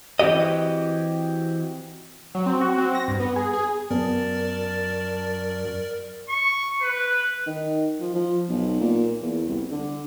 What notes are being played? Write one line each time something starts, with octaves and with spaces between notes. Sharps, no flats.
E3 C4 F#4 G4 D#5
F#3
C4
F#4
C4
A#6
G2
B3
G#4
G#4
F#2 B3 A#4 D5 A5
C#6
B4
D#3
F3
F3
B1
A#2
E2
C2
D3